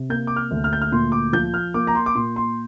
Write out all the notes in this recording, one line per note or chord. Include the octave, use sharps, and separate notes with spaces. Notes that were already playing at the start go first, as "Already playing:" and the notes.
Already playing: C3
A#3 G6
D6
F6
D2
F6
G6
F6
A#2 C6
D6
F3 G6
F6
A#3 D6
A#5
C6
D6
A#2 C6
C6